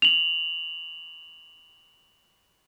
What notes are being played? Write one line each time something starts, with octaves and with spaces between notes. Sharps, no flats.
F7 F#7